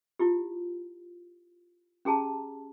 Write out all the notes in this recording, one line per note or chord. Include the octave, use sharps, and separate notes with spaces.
E4 F4 G4
C#4 G4 G#4 A5 A#5